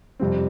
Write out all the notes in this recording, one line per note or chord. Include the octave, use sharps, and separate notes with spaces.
F2 C3 G3 C4